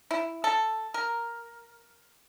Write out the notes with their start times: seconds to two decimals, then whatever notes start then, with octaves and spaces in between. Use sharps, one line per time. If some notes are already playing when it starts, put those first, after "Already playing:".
0.11 E4
0.44 A4
0.94 A#4